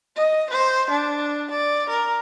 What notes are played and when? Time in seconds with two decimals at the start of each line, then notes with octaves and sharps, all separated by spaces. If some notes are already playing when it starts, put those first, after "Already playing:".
0.17 D#5
0.50 C5
0.90 D4
1.51 D5
1.89 A#4